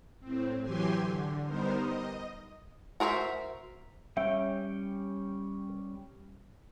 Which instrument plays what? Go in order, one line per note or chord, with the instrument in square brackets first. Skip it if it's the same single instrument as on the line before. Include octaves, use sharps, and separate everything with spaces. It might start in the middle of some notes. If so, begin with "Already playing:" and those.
[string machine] A2 C4
E3 F#3 G4 G#5 C6
D3
G3 B3 D#4 A#4 C5
D#5
[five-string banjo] F#4 A#4 C5 C#5 E5
[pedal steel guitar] G3 C#4 G5 [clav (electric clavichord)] E5